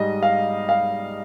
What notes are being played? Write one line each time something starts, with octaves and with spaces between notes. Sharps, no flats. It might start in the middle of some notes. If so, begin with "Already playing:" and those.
Already playing: G#2 G3 D#5
F5
F5